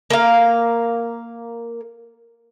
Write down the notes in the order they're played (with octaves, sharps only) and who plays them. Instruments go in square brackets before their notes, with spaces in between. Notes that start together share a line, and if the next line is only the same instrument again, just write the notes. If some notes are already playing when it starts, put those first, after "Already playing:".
[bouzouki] A#3 F5